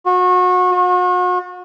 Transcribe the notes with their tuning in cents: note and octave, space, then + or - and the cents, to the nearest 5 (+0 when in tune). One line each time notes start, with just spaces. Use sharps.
F#4 -30
F#4 -40